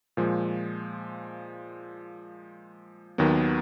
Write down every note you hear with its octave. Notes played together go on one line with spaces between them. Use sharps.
A#2 F3 G#3
D#2 D#3 F#3 B3